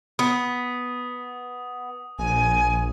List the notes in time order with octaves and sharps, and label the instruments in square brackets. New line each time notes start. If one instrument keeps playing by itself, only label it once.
[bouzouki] B3 [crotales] D#6
[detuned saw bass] A#1 [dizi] G#5